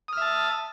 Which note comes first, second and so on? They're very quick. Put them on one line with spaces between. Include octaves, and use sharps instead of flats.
D#6 F6 E5 A5